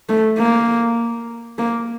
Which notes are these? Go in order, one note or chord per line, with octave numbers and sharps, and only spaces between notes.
A3
A#3
A#3